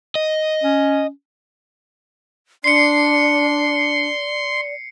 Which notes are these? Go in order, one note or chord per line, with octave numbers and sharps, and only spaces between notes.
D#5
C#4
D4 D5 C6 C7 C#7